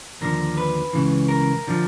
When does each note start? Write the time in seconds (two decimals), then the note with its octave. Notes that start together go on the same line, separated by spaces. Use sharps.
0.21 D#2 D3 F3 A#4
0.57 B4
0.93 C#2 C#3 E3
1.28 A#4
1.67 D3 F3